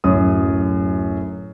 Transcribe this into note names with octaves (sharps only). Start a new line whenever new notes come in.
D1 F#2 D#6